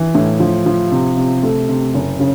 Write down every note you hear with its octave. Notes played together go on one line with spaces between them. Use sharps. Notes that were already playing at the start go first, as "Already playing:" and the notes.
Already playing: E3
A2
F3
F3
C3
C3
A3
C3
F#1
C#3